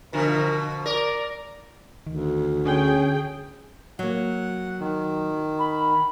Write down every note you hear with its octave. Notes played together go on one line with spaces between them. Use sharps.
B2 D3 F3 A#4
A#4 D5
D2 D#3
D3 C#4 G#4 G5
F#3 A#3 F#5
D#3
B5